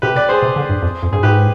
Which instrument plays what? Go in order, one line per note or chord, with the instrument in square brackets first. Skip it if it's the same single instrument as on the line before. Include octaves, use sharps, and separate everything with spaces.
[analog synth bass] C3 [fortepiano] G4 B4
[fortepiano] B4 D5
G#4 C5
[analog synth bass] C3
D3
G2
F2
F2
[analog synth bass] G2 [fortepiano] G#4
[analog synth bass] G#2 [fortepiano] G4 B4